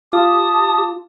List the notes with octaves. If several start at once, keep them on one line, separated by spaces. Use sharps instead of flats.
F4 G4 A5 D#6